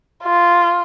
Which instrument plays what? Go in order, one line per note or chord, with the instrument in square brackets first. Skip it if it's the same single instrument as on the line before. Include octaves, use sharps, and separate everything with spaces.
[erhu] F4